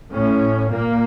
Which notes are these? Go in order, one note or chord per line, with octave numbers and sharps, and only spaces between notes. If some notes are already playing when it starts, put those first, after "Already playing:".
A2 C#4
A#2 A#3